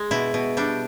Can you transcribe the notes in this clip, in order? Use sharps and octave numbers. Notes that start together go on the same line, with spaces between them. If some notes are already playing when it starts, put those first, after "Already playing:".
Already playing: G#3
B2 E4
B2
G3 D4